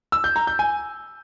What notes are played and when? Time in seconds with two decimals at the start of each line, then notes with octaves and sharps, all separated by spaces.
0.12 E6
0.24 G6
0.36 A#5
0.47 G6
0.59 G#5